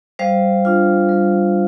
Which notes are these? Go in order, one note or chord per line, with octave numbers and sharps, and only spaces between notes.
G3 C5 F5
D4 F4
G3